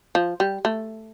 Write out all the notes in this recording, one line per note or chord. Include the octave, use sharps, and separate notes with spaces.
F3
G3
A3